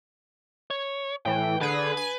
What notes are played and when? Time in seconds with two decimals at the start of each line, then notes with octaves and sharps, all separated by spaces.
0.70 C#5
1.26 A2 E3 G5
1.61 D3 G#4 B4
1.97 G#5